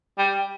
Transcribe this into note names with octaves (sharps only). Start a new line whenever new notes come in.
G3